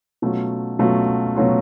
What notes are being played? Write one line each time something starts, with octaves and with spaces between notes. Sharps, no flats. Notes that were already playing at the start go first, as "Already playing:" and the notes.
B2 F#3 A3 C#4 F4
B2 F#3 A3 C#4 F4
B2 F#3 A3 C#4 F4